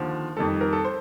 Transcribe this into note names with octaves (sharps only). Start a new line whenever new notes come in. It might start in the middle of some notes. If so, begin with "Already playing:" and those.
Already playing: D#2 D3 F3
F2 D#3 G3 A4
A#4
A4
C5